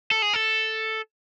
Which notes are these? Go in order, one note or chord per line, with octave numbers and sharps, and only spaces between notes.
A4
G#4
A4